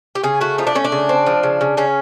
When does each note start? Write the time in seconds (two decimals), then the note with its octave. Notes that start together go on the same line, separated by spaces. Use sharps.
0.15 G4
0.23 C#3 G#4
0.41 A3 F#4
0.58 F3 D#4
0.67 D4
0.75 A3 C#4
0.85 D4
0.92 C#3
1.09 C4
1.26 F3
1.43 C#3
1.61 C#3
1.77 C#3 C#4